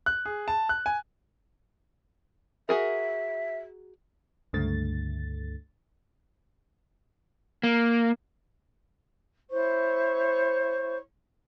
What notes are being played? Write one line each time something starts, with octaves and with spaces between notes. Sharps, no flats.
F#6
G#4
A5
F#6
G#5
F#4 G#4 A#4 E5
C#2 G2 D3 A3 A6
A#3
E4 C5 C#5 C#6